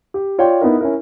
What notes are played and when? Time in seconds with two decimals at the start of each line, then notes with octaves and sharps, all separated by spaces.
0.14 G4
0.38 F4 C#5 D5 G5
0.61 B3 D#4 E4 A#4
0.81 C#4 E4 A#4